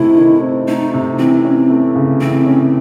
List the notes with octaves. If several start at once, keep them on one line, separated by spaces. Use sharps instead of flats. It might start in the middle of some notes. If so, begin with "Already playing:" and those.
Already playing: C3 D#3 A3 C4 E4
D#3
C4
A3 D#4
C3
E3 C4
C#4
A3
C#3
E3 C4
C#4